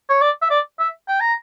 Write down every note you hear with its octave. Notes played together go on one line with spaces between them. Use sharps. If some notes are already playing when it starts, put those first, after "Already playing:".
C#5
D5
E5
D5
E5
G5
A#5